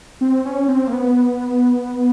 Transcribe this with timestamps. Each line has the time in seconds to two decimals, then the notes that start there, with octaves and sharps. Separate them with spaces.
0.21 C4
0.45 C#4
0.68 C4
0.87 A#3
0.93 B3